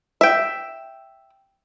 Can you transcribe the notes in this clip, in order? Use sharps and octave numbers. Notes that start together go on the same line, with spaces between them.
E5 G5